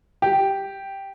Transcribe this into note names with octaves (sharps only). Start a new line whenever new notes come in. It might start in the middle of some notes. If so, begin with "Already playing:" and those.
G4